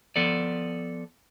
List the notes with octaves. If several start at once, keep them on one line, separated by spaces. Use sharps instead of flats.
F3 B3 A4 D5